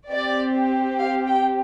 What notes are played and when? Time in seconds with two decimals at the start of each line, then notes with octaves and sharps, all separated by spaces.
0.11 C4 G4 D5
0.99 F5
1.28 G5